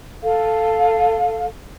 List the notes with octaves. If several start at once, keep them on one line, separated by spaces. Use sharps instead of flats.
A4 F5